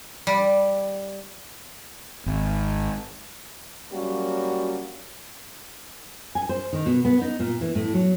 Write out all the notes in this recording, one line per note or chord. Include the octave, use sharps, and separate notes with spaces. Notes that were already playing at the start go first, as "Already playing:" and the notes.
G3
G#1
F#3 G3 A#3 C#4 F#4
G#5
C5
D#3
B2
B3
D#4
A#2
E3
A2
F#3